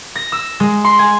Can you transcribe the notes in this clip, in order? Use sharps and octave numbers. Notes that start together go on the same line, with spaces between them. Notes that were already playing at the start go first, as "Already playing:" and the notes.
A#6
E6
G#3
C6
G#5